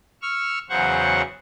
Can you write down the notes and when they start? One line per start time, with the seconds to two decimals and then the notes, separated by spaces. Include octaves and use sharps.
0.22 C#6 E6 F6
0.69 E2 C#3 F#3 C5 F#5 C#6